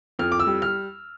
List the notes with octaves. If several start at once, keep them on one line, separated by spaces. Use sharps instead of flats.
F2 F6
D6
E6
G3
F6